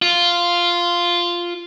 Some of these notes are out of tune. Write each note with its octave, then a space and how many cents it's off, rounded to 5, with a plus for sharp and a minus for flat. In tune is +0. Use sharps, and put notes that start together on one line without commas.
F4 -5